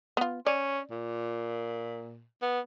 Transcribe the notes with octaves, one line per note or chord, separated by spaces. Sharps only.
B3 F4
C#4 D5
A#2
B3